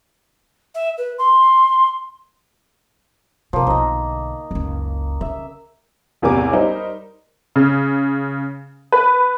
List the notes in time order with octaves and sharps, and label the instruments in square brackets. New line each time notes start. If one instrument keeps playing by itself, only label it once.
[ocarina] E5
B4
C6
[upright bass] C3 [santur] F3 A#3
[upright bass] B1 D3 [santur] D#4 D#5
[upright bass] F#1 C#2
[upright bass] C#3 [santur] E5
[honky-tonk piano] A1 E2 C3 A#4 G#5 D6
G3 D#4 A#4 C5
C#3
B4